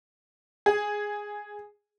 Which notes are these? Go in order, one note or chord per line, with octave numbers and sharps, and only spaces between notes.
G#4